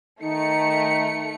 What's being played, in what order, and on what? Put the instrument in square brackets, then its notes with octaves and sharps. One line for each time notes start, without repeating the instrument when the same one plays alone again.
[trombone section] D#3 D#4 [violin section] A3 C#7